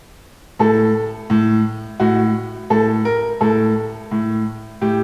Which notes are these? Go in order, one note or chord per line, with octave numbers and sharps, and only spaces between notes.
A2 A4
A2
A2 F#4
A2 A4
A#4
A2 A4
A2
A2 G4